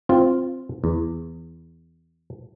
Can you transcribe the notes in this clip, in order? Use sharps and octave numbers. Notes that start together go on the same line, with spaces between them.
C4 F4
E2